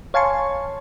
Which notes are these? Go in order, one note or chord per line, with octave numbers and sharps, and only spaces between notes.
C#5 F5 G#5 A5 C6 C#6